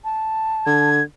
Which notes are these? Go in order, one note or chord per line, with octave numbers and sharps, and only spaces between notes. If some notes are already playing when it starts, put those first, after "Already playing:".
A5
D3 G#6